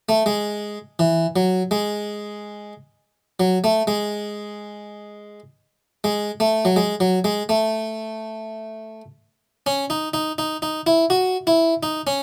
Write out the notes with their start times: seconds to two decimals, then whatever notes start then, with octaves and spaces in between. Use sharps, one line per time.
0.09 A3
0.26 G#3
0.99 E3
1.36 F#3
1.71 G#3
3.40 F#3
3.64 A3
3.87 G#3
6.04 G#3
6.40 A3
6.65 F#3
6.76 G#3
7.00 F#3
7.24 G#3
7.49 A3
9.66 C#4
9.90 D#4
10.14 D#4
10.38 D#4
10.62 D#4
10.87 E4
11.10 F#4
11.47 E4
11.83 D#4
12.07 C#4